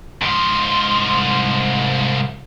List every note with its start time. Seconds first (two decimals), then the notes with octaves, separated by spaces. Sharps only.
0.21 C2 G#2 F3 C6